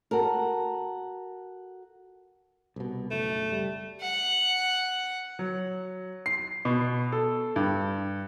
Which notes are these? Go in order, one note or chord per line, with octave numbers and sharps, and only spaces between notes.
F#4 A4 A#4
C2 B2
F#1 B1 A3
G3
F#5
F#3
C7
B2
A4
G2